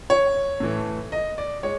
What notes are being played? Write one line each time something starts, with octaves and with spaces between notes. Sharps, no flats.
C#5
A2 E3 A3
D#5
D5
G#3 C#5